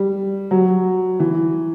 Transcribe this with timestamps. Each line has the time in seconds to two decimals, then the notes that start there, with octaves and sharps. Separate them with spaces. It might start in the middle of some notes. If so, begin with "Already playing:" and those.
Already playing: G3
0.51 F#3
1.20 E3